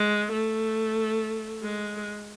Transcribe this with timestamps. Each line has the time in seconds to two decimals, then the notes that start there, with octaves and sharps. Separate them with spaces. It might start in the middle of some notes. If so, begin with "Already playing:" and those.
Already playing: G#3
0.32 A3
1.63 G#3